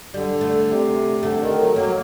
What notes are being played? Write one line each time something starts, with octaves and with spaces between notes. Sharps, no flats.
D3 G3
A3
C3
D3 A3
D#3
F#3
F#3 A#3